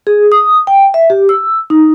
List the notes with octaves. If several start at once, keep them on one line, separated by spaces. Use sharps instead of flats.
G#4
D#6
G5
E5
G4
E6
D#4